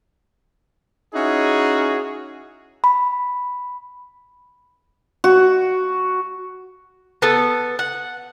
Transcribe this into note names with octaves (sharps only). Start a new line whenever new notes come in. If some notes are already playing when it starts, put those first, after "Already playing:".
C#4 D#4 E4 F#4 G#4
B5
F#4
B3 A4
F#5